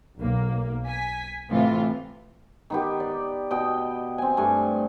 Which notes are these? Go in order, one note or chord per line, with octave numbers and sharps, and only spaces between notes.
B1 A#3
G#5 B6
A2 C3 E3 F4
D#3 B3 G4
D5
B2 D#5 G5
C4 G#5
G2 A3 G#5